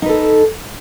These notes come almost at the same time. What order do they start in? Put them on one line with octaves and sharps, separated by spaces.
D#4 B4 A4